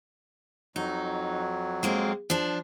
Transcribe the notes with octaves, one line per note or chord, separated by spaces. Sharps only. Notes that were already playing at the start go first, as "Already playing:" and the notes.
F2 F#3 D#4
G#3 A#3 C4
F3 D4